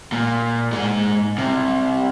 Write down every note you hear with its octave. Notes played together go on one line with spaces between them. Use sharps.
A#2
G#2 G#4
C2 C3